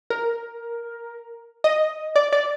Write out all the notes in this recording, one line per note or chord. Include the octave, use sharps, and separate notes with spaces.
A#4
D#5
D5
D5